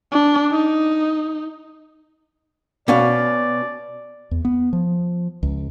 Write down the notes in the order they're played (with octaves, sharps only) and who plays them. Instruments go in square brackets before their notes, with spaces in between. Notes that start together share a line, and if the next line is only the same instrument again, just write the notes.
[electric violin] D4
D#4
[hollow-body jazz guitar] B2 C#4 F5 [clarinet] D5
[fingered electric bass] E2
B3
F3
C#2